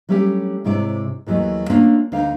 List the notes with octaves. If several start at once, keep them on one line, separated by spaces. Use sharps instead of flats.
F#3 G3 A3 C#4 F#4 G4
G#2 C3 E4 C#5 D5
D#2 E3 F#3 A3 D#5
A3 A#3 C#4 D4 F4 A#4
D2 D#4 F5